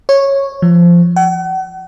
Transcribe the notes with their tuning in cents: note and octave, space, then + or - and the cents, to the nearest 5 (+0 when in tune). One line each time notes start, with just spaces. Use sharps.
C#5 -10
F3 -15
F#5 +40